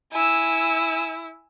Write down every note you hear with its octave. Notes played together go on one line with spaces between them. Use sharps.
E4 G#5 E6